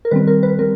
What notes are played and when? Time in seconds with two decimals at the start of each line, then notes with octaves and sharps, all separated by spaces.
0.05 A#4
0.11 D#3 G3 C4 B4
0.27 A#4
0.43 B4
0.59 G3 C4 A#4